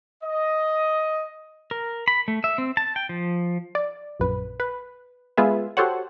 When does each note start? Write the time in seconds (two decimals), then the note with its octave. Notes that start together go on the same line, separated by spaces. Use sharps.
0.23 D#5
1.71 A#4
2.08 B5
2.28 A3
2.44 E5
2.58 C4
2.77 A5
2.96 G5
3.09 F3
3.75 D5
4.19 A#1 F#2 B4
4.60 B4
5.37 G#3 B3 F4 G#4 B4 E5
5.77 F#4 G4 A4 C5 C#5 F#5